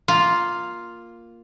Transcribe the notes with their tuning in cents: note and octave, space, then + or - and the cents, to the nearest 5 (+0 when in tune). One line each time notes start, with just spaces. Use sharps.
A#3 +0 F4 +0